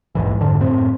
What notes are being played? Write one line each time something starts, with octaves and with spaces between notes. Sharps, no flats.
A#1 D#2 G#2 E3
F2 G#2 D3 D4
F#2 A2 C4